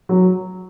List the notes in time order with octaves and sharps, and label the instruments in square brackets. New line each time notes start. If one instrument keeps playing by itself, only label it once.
[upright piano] F#3